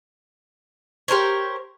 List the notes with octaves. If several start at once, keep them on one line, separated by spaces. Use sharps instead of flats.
G4 A#4 C5 C#5